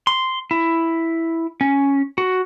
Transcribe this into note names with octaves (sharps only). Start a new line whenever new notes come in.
C6
E4
C#4
F#4